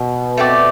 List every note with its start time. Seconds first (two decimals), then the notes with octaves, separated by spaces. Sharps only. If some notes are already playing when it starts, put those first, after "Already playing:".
Already playing: B2
0.38 A3 C4 G4 D5